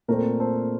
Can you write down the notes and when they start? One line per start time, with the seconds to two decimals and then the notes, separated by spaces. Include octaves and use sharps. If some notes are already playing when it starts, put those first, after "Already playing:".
0.08 A#2 A3 C4 A#4
0.40 A4 C5